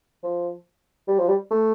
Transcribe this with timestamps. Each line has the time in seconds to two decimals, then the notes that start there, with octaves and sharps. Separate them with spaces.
0.23 F3
1.08 G3
1.18 F3
1.29 G3
1.51 A3